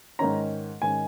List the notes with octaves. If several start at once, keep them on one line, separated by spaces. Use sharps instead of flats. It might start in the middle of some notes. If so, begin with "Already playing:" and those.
G#2 D#3 C#4 A#5
G#2 D#3 C#4 G#5